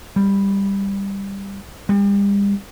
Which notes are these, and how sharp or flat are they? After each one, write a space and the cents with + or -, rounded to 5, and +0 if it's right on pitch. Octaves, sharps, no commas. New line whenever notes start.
G3 +10
G3 +40